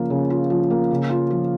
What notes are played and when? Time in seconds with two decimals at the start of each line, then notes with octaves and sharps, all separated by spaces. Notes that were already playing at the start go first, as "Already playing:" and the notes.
Already playing: C#3 F3 A#3 F4
0.10 C#3
0.30 F4
0.50 F3
0.70 A#3
0.91 C#3
1.10 F4
1.30 F3